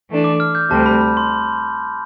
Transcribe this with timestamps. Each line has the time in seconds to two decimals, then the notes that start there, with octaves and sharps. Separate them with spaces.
0.09 E3 A3 D4
0.24 D6
0.40 F6
0.55 G6
0.70 D2 C3 G3 A5
0.86 B5
1.01 B5
1.17 C6